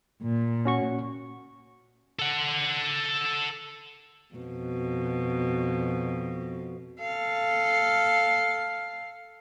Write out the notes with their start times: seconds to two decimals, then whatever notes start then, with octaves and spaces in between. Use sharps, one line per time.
0.22 A#2
0.65 C#4 F#4 C#6
2.19 A4 F#5
4.35 F2 B2
7.00 A4 F5